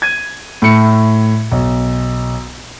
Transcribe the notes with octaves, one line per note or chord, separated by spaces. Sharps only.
G#6 D#7
A2 C#7
B1